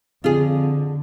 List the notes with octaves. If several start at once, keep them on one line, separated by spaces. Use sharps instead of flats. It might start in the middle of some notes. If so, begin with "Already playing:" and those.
F2 D3 F4 G#4